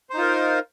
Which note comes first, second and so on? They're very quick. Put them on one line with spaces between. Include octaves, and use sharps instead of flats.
C5 D#4 F4 A#4